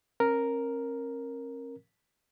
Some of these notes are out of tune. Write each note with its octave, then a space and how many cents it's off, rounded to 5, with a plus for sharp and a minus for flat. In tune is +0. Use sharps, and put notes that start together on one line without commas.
C#4 -45 A#4 +0